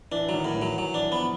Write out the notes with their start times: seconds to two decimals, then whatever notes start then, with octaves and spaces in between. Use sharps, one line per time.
0.12 E3 D4
0.29 F#3
0.34 D#3
0.45 A2
0.56 E3
0.62 F#3
0.78 E3 F#3
0.94 E3 D4
1.11 F3 B3